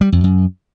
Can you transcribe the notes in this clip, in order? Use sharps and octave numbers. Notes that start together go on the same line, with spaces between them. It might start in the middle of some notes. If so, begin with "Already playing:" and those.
G3
F2
F#2